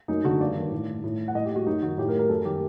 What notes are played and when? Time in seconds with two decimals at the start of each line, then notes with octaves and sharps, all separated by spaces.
0.08 F#2 D#4
0.24 D3 F#4
0.41 G2 D5
0.56 D#3
0.71 A2
1.04 A2
1.28 F#5
1.35 A2 D#5
1.45 G4
1.56 F#4
1.66 F#2 D#4
1.83 D#3 F#4
1.98 A2 G4
2.08 A#4
2.19 A#4
2.29 F#2 A4
2.45 D#3 G4